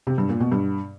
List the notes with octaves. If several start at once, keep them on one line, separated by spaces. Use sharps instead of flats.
C3
G2
A#2
B2
G2